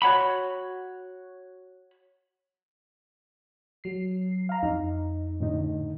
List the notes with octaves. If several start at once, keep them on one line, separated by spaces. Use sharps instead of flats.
F#4 C#5 F#5 B5
F#3 C7
F5 A#5
F2 D#4
A2 D3 D#4